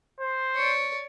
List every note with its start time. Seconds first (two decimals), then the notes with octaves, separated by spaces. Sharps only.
0.20 C5
0.56 C#5 D5